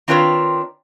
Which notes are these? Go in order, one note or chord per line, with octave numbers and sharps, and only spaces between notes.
D#3 C4 D4 F4 B4 C#5